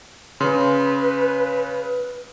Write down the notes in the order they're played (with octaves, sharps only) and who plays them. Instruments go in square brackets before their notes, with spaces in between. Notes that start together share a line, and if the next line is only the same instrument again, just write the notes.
[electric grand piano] C#3 [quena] B4 [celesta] C6